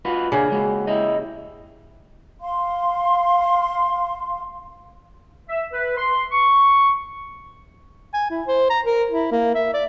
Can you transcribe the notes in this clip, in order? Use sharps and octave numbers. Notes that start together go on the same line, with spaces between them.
F4 F#4 B4
C#3 A#3 D4 G#4
G#3 F#4
E4 G4 D#5
F5 C6
E5
B4
C6
C#6
G#5
E4
C5
A#5
A#4
E4
A#3
E5
D5